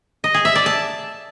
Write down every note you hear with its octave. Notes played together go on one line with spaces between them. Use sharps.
D#5
G#4
E5
D5
A5